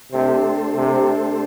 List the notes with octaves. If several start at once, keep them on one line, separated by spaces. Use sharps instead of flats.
C3 A3 D4 A4 C5
C3